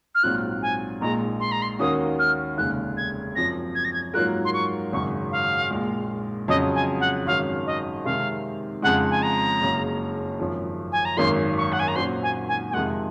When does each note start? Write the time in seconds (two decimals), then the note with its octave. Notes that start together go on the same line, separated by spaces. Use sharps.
0.14 F6
0.23 A#1 G#2 F#3 C4 F4 F#6
0.62 G#5
1.01 A#1 A#2 G#3 D#4 A#5
1.39 C6
1.51 A#5
1.62 C6
1.79 D#2 D#3 A#3 C#4 F#4 D#6
2.19 F6
2.57 F1 D#2 C#3 G#3 F#6
2.97 G#6
3.35 F#2 F3 C4 A#6
3.74 G#6
3.84 A#6
3.93 G#6
4.14 G#2 F#3 A#3 F4 A#4 F#6
4.44 C6
4.53 C#6
4.92 G#1 F#2 C#3 F#3 C#6
5.31 F5
5.70 A#1 A#2 G#3
6.48 F2 C#3 F#3 C#4 D#5
6.74 G#5
7.00 F#5
7.26 G#1 F#2 D#3 F#3 C#4 F5
7.66 D#5
8.04 C3 D#3 G#3 C4 F5
8.82 F2 C#3 G#3 F#5
9.10 G#5
9.22 A#5
9.61 F#1 F#2 C#3 F#3 C#4
10.39 G#1 F#2 F3
10.92 G#5
11.05 A#5
11.17 G#1 F#2 D#3 F#3 A#3 C6
11.57 C#6
11.72 F#5
11.79 G#5
11.87 A#5
11.95 A#2 F#3 C#4 F#4 C5 C6
12.22 G#5
12.48 G#5
12.70 G#5
12.73 F2 C3 D#3 G#3 F#5